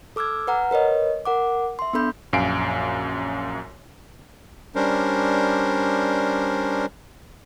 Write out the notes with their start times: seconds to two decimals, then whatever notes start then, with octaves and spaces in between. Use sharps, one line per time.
0.16 A4 D6 E6 F6 G#6
0.47 B4 F#5 A#5 F6
0.71 A#4 B4 C#5 D#5
1.26 A#4 F#5 D6
1.79 E5 C6
1.93 B3 D4 A4 B5 G6
2.33 A#1 F#2 F5 G#5 C7 D7
4.75 G3 C#4 D4 A#4 C5